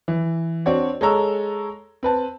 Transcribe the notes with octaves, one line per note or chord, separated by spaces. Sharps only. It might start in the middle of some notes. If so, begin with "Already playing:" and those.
E3
C4 D4 F#4 C#5 D5
G#3 A4 C#5 A#5 E6
C4 B4 A5